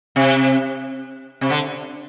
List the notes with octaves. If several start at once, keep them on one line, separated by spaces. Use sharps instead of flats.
C3
C3
D3